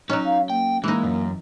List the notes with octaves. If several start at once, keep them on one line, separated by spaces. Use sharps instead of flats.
F#3 C#4 D#4 D#5
F5
A#3 G5
E3 G#3 A#3 D#4
F#2